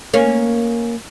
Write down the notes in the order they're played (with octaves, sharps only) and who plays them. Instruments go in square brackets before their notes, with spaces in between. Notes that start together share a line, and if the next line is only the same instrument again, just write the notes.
[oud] A#3 C#4